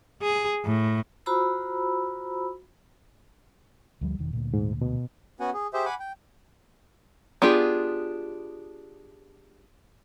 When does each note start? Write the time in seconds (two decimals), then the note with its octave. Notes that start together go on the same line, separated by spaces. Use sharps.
0.22 G#4
0.65 A2
1.26 F4 F#4 C5 A#5 B5 E6
4.01 D2 F3 G3
4.19 E1 D#3
4.33 D2 A#2
4.54 G#2
4.81 B2
5.40 B3 C#4 F#4 F#5 G#5
5.54 G#4
5.74 G4 G#4 C5 E5
5.85 F#5 G#5 B5 D6
6.00 G5
7.42 B3 D4 F4 G4 G#4